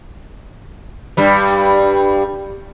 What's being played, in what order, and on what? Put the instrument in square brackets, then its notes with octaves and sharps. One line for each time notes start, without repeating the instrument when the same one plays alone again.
[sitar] G2 G3